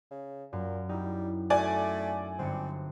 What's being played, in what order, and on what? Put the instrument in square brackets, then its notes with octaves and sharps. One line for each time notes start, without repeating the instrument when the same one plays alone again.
[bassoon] C#3
[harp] F#2 [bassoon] A#2
[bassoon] G3 [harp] D#4 E4
[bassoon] A3 [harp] F#4 A4 [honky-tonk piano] D5 G#5
[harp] G1 C#7 [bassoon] C4